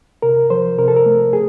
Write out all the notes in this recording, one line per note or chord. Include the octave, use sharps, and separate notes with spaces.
C3 A#4
F3 C5
C3 A#4
A4
A#4
A3
G#4